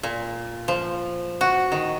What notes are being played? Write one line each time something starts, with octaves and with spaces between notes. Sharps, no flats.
A#2
F3
F#4
D#3